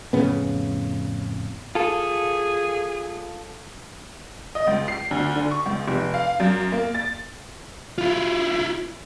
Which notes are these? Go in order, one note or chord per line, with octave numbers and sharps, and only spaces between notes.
F2 A2 C#3 B3
F4 G#4 A4
D#5
C#2
C7
D2
D3
C#6
C#2
F1
F5
F#2
A#3
A6
E4 F4